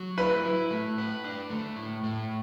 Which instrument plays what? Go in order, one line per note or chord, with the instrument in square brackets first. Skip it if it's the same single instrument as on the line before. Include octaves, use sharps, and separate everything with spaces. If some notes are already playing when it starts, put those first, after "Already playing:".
Already playing: [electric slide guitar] F#3
[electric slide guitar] E4 [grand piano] B4
[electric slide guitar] E4
A3
B4
D4
A3
A2
A2